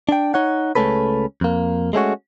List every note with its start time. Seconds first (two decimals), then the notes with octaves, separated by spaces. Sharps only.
0.09 D4 G5
0.34 D#4 C#5 F#5
0.75 C#2 G#3 A3 C#4 A4 B4
1.41 F2 A#3
1.93 G#3 A3 C#4 F#4